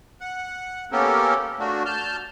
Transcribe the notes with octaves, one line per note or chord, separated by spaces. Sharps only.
F#5
A#3 B3 C#4 G4 A4 A#4
A3 D4 F#4
A5 F6 G6